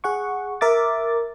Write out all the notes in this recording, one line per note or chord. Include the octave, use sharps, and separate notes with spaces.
G#4 F#5 C#6
A#4 E5 D6 A6